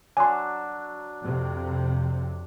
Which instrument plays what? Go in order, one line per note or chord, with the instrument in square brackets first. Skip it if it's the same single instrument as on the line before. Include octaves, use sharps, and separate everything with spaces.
[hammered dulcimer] F#3 D4 [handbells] G#5 C6
[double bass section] F2 C3